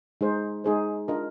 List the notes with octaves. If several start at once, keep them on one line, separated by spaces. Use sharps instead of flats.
G#3 D#4 G#4 C5
G#3 D#4 G#4 C5
D4 F4 A#4 D#5